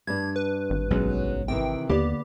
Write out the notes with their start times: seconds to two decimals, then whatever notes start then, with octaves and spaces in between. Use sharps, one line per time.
0.07 G2 D4 G#6
0.36 B4
0.70 G#1
0.91 B1 G2 F#3 G#3 C#4
1.48 C3 D#3 E3 G5
1.89 D#2 D3 A#3 B3 G4 C#5 D5